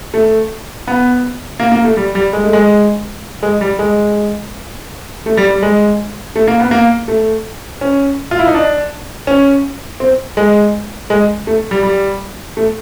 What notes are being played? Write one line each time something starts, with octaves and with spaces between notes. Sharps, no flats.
A3
B3
A#3
A#3
A3
G3
G3
G#3
A3
G#3
G#3
G3
G#3
A3
G3
G3
G#3
A3
A#3
B3
A#3
A3
C#4
F4
E4
D#4
D4
C#4
C4
G#3
G#3
A3
G3
G3
A3